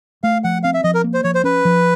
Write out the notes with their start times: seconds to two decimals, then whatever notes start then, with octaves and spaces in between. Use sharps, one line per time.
0.23 A3 F5
0.44 F3 F#5
0.63 C4 F5
0.74 E5
0.84 F3 D#5
0.95 A#4
1.04 A#3
1.14 C5
1.24 F3 C#5
1.35 C5
1.44 C#4 B4
1.65 F3